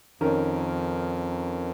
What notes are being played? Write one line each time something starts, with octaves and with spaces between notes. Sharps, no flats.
F2 D#3 C#4 A#4